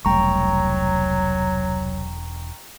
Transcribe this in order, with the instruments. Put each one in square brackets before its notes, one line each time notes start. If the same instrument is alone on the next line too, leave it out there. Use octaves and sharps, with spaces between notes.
[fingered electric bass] E1 [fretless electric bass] C2 G3 A3 [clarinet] F#3 [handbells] G5 A#5 C#6